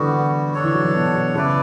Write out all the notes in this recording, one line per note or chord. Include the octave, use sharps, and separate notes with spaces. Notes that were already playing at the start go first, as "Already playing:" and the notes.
Already playing: D3 E3 G3 B3 F#4
D4 A4 C#5
E3
F#3
E3
B2
B2
C#3 E4 B4 D5